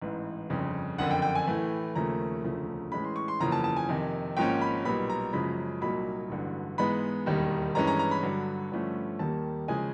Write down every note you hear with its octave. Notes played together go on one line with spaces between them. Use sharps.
A1 G#2 E3
G1 F2 C#3
F#1 F2 D3 F#5
G5
G5
G#5
A2 E3 A3
D#2 C#3 F3 A3 A#5
E1 D2 C#3 F3 A3
A2 E3 G#3 C#4 B5
C6
C#6
C6
F#1 E2 C#3 F3 A#3 A#5
A5
A5
G#5
F2 C3 D#3
G#1 G#2 F3 A#3 C#4 G5
B5
B1 A#2 G3 B3 B5
A#5
F#2 C#3 F3 G#3 B5
C2 A#2 F#3 A#3 D#4 B5
A1 G2 D3 F#3
G#2 E3 G#3 B3 B5
E1 D#2 D#3 G3
G2 E3 G#3 C#4 A#5
A#5
A#5
B5
G2 D3 F#3
G2 D3 F3 A3 C#4
D#2 D#3 G3 A#3 A5
C#3 F3 G#3 G#5